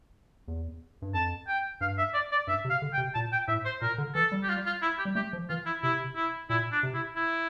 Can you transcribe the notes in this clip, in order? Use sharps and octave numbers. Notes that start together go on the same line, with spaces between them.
E2
G2
F2 A5
G5
G2 F5
E5
D5
D5
G2 E5
C3
F5
D3
G5
C3
A#2 A5
G5
A2 E5
C5
A#2 A#4
D3
E3 A4
G3
G4
F4
F4
E4
G4
G3
A3 G4
F3
E3 F4
E4
C3 E4
E4
A#2 E4
D4
C3
E4
E4